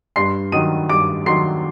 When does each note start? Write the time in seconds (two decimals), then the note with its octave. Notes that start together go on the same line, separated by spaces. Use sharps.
0.16 G2 C6 C7
0.52 D#3 F#3 D#6 D#7
0.89 G2 D6 D7
1.26 D#3 F#3 C6 C7